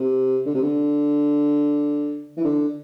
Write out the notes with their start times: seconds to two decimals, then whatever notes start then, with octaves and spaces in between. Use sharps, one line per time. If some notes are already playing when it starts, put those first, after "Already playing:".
Already playing: C3
0.46 D3
0.54 C3
0.62 D3
2.37 E3
2.44 D3